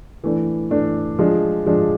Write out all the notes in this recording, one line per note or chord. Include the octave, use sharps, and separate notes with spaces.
E3 A3 D4
E3 A3 D4
F3 G#3 D4
F3 G#3 D4